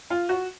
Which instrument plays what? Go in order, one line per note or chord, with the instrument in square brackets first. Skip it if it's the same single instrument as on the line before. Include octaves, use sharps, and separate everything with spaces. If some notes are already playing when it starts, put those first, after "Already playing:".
[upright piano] F4
F#4